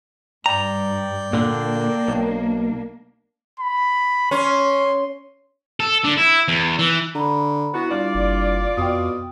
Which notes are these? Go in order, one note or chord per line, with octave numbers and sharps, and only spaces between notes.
G2 D5 G5 A#5
A#2 D3 A#3 D4
B1
B5
C#4 C6
A4
D3
E4
E2
E3
D3 A#5 B5
B3 E4 F#4
G2 F4 D5
F#1
F2 B2 G5 D#6